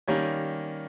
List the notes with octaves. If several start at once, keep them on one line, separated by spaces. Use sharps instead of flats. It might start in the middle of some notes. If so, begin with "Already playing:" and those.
D#3 G3 A#3 C#4